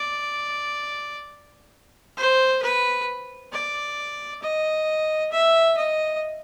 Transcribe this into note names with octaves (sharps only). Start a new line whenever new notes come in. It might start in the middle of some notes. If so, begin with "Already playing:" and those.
Already playing: D5
C5
B4
D5
D#5
E5
D#5